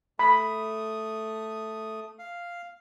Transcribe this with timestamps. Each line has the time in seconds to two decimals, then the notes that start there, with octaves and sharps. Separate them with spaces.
0.19 A3 B5 D#6
2.19 F5